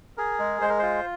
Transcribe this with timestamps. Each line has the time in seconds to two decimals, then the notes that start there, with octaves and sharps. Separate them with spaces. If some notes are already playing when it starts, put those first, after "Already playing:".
0.17 G#4 A#4
0.39 G#3
0.61 G#3 C5
0.69 A#4
0.79 F4 C5